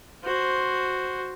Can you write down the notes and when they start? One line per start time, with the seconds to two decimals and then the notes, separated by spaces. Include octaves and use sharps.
0.24 F#4 C5